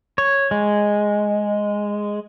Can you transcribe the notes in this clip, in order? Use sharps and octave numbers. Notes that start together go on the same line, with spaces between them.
C#5
G#3